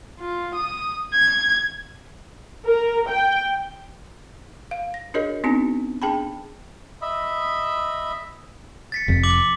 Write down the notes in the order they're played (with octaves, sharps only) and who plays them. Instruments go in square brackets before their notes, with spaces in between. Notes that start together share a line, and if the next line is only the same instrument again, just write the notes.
[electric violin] F4
D#6
G#6
[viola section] A#4
G5
[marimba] F5
A#6
D4 F#4 G#4 A#4 C#5 D#5
B3 C4 D4 D#4 F#4
D4 G#4 G5 A5 B5
[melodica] D#5 E5 B5
[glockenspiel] A6 B6 C#7
[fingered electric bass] F1 F2
[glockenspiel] D6 F#7